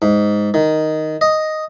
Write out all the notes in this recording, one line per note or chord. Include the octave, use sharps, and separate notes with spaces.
G#2
D#3
D#5